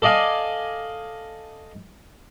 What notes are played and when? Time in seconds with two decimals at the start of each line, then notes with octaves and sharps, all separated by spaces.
0.02 A4 D5 D#5 F5 G#5